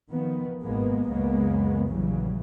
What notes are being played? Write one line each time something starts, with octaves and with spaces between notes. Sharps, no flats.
D#3 F3 B3
G#1 B2 G#3 A#3 B3
C#2 F#2 C#3 G#3 A#3 B3
A#1 F2 C#3 E3 F#3 G3